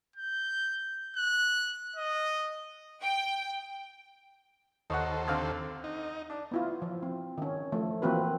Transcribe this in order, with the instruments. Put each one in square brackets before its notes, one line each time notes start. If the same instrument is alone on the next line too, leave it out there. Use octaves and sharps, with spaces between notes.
[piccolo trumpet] G6
F#6
D#5
[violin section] G5
[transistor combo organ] D#2 A4 C5 [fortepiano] D#4 C#5 F#5
[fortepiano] D3 C4 F5
[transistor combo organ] D#4
[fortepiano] D4
[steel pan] B3 E4 F4
F3
C4
D#3 C#4
F3 A3
E3 F3 A#3 C4 F#4 B4